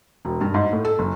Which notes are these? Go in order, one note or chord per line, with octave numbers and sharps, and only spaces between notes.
E1
G2
G#2
A2
A4
F#1